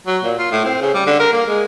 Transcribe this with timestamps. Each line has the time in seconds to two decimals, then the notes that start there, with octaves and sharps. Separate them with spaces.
0.07 F#3
0.24 A#2
0.39 F4
0.52 A2
0.65 C4
0.81 C#3
0.94 G3
1.06 D3
1.20 A#4
1.33 A#3
1.47 G#3